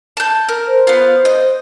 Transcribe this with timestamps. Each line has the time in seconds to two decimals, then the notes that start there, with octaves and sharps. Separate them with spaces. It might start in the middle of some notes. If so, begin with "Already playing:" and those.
0.17 A5 G6
0.49 A#4
0.67 C5
0.87 B3 F4
1.25 D#5